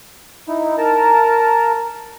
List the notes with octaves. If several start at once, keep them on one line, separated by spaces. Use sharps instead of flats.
D#4 E4
A#4 A5 A#5